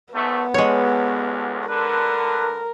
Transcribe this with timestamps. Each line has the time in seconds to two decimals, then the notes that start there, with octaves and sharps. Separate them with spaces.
0.14 G#1 A3 B3
0.54 A1 D2 G#3 C#5
1.68 D3 A#4 B4